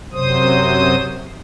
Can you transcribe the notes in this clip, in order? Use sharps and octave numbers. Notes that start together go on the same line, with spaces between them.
F#2 C3 F#3 C5 D#6